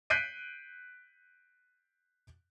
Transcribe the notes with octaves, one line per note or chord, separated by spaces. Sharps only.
F#6 G6 B6 C7 D7 D#7